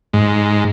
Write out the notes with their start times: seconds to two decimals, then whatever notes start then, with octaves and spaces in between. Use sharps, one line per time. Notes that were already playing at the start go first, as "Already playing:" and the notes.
0.13 G#2